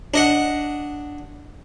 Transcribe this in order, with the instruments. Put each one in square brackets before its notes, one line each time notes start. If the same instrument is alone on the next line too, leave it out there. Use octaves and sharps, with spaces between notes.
[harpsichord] D4 D#5 F#5